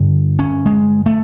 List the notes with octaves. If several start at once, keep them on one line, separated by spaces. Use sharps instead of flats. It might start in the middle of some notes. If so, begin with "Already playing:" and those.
Already playing: G2 D3
C#4
G#3
A3